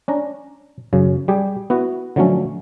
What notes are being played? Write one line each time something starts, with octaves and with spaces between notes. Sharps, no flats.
C#4 D4 A#5
F#2 C#3
G3 G4 G#4
B3 E4 F#4
D3 F3 F#3 A3 C#4